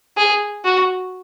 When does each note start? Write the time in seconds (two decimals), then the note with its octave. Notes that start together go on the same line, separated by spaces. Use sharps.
0.17 G#4
0.65 F#4